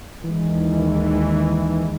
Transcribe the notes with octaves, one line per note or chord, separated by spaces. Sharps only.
D#2 D#3 E3 G#3